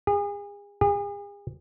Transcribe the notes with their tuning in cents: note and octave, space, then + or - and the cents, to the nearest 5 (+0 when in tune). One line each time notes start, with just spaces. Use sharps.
G#4 -35
G#4 -40